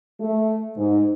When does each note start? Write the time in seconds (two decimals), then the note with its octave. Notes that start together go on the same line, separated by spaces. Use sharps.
0.20 A3
0.77 G#2